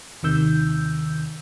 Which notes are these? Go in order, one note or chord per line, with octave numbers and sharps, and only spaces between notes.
D#2 C3 D#3 E6 G6